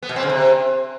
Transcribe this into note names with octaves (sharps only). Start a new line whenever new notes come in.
B3
B2
C4
C#3
C3